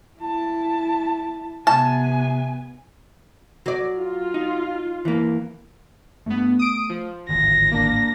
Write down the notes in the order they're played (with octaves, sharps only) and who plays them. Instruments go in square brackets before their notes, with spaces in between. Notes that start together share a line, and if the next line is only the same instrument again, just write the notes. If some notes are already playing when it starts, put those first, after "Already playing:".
[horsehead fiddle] E4 A5
[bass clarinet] C3 [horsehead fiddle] B3 G#5 [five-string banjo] A5
[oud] F#3 D5
[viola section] F4
[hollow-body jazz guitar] D#4
E3 A#3
[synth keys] G2 B3 [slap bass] A3
[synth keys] D#6 D7
F3
[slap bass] D1 G#1 [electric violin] A#6
[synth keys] A#3 D4